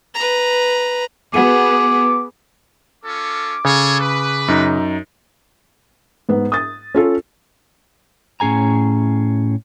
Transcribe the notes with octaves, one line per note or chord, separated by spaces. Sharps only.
B4 A#5
B3 F#4 G#4 F#5 D6 D#7
C#4 F4 A4 D6
C#3 G#4 A4 C#5
B4
F#2 D#4
G#2 B3
D#6 A6
C#4 F4 A4
A2 C#4 G#4 G#5 A#5